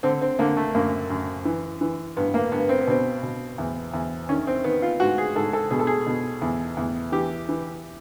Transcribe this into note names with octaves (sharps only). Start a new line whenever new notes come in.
D3 C4
C4
D3 A#3
A3
F#2 A#3
F#2
E3
E3
G2 B3
A#3
G2 B3
C4
B3
B2 C4
B2
E2
E2
D#3 C#4
C4
D#3 B3
F4
G#2 F#4
G#4
G#2 A4
A4
B2 G#4
A4
G#4
B2
E2
E2
E3 G4
E3